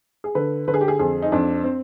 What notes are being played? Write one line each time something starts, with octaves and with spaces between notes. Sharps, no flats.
G#4
D3 B4
D3 B4
G#4
G4
G#4
F2 G#4
D#4
F2 D4
C4